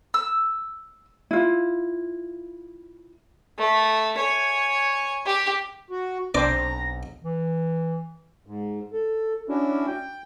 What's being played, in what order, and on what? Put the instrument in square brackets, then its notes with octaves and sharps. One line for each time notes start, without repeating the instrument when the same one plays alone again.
[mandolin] E6
[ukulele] E4 F4
[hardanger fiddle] A3
C#5 G#5
G4
[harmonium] F#4
[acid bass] B1 [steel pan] C4 D4 C5 [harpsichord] D5 [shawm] A#5
[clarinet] E3
[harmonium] G#2
A4
C#4 D4 E4 F#4
G5